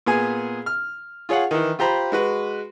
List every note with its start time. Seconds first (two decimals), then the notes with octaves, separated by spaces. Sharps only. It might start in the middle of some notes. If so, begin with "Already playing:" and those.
0.06 A#2 B3 G#4 G#5
0.66 F6
1.29 F4 G#4 C#5 F5 F#5
1.51 D#3 E3
1.79 F4 G4 C5 A#5 B5
2.12 G#3 F#4 B4